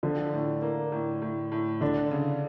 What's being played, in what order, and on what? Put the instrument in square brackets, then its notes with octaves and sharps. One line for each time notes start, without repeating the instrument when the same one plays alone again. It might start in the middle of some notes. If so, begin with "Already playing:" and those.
[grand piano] D3 [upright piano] F3
[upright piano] A2
A#3
A2
A2
A2
[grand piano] D3 [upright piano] D4
[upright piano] C#3